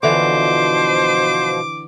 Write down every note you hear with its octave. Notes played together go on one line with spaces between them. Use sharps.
B2 D3 E3 F3 C5 D6